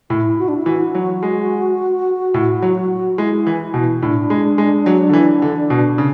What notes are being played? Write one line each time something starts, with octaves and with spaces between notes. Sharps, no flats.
A2 E4
F#4
D4
E4
E3 F#4
F#3
G#3
A2
F#3
G#3 E4
E3
B2
A2 D4
G#3
G#3
F#3
D3
E3
D3
B2
C#3